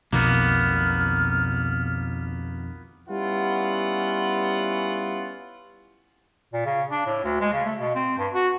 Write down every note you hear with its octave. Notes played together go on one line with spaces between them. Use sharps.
B1 F2 B2 D#3 A#3 B3 F6
G3 B3 C#4 E4 F4 F#5
A#2
C#3
D4
A2
D2
G#3
C#3
A3
B2
C4
G2
F#4